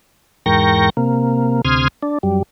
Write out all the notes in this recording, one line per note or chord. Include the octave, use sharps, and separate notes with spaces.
E2 G#2 A#4 G5 C#6 A#6
C3 A#3
D2 C3 C6 D#6 F6 G#6
D4
F#2 G3